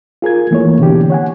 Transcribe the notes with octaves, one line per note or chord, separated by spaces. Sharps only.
F4 G#4 A#4 G#6
E3 A3 A#3 E4 C#5
B2 D3 E3 D4 G4
C#5 F#5 G#5